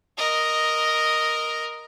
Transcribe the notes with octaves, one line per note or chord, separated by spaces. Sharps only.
A#4 D#5